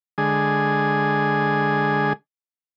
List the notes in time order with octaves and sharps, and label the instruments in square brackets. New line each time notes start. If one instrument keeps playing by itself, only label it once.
[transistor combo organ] D3 G#3 G#4